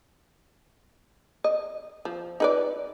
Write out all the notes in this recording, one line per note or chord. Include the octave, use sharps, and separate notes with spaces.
D#5
F3
D#4 B4 D5